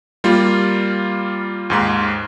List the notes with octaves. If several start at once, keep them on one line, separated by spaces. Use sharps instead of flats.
G3 A#3 F4
D#2 G#2 C6